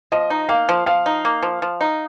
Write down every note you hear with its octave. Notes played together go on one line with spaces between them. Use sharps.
F3 D#5
D#4
A#3 F5
F3
F3 F5
D#4
A#3
F3
F3
D#4